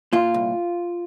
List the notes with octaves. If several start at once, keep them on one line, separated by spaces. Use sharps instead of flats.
A#2 F4
C2